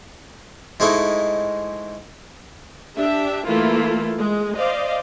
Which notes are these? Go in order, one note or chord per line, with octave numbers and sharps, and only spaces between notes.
G#2 G#3 A3 D#4 E4
D4 G4 E5
E3 A3 A#3 E4 F4
G#3
C5 D5 D#5 F5